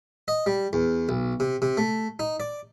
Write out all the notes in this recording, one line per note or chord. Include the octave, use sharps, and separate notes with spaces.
D#5
G3
E2
B1
C3
C3
A3
D#4
D5